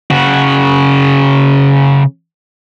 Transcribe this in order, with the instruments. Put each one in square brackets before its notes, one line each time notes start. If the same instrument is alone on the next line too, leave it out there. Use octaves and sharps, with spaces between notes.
[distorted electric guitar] C#3 F#4